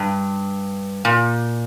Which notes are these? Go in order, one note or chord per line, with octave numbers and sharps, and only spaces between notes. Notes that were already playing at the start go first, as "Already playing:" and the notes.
Already playing: G2
A#2